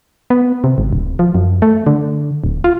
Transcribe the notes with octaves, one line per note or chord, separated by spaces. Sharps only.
B3
C3
G#1
D1
F3
F#2
A3
D3
D1
F4